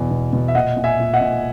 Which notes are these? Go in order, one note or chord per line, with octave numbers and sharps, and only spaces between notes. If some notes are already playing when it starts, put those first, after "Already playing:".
Already playing: E2 B2
B2
B2
E5
A#2 D#5 F#5
A#2
E5 G#5
A#2
D#5 F#5
A#2